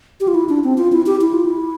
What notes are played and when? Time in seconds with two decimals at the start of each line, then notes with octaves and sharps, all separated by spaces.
0.20 G4
0.28 F4
0.34 E4
0.49 D4
0.64 C4
0.78 F4
0.92 E4
1.06 G4
1.21 E4
1.34 F4
1.46 E4